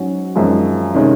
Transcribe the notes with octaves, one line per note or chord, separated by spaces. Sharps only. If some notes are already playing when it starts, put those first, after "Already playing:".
Already playing: G#2 F#3 C#4 F#4
G#1 F#2 F3 G#3 C#4
C3 D#3 G#3 C#4